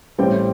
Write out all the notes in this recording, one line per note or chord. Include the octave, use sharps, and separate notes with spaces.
A1 A2 G3 C4 G5